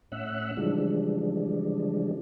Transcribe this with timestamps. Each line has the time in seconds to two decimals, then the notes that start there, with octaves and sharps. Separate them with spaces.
0.12 A2 C#4 E5 F#5 E6 F#6
0.57 C#3 E3 F3 G3 G#3 D4